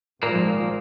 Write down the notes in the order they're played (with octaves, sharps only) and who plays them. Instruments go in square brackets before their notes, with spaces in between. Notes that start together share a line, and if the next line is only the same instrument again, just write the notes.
[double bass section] G#1 F3 [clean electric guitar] A#2 A#3